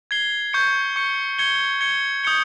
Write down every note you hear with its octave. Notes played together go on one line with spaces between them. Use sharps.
G#6 C7 G7
C#6 G6 C#7
C#6 G6 C#7
G#6 C#7 G7
G#6 C#7 G7
D#6 G6 C#7 G7